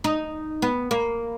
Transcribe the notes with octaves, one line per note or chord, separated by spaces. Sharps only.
D#4
B3
A#3